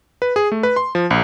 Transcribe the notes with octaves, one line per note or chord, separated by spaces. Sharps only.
B4
G#4
A3
B4
C6
F3
A#1